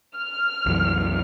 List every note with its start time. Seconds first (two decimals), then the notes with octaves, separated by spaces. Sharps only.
0.17 F6
0.66 C2 F#2 E3